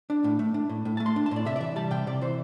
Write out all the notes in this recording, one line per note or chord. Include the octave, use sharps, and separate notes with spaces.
D4
A2
A3
D4
A2
A2
A3 A5
C6
D4
A5
A2 D5
C3 E5
D5
E3 E5
G3 A5
C3 G5
C3 D5
E3 C5